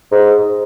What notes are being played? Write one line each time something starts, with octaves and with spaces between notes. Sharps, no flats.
G#2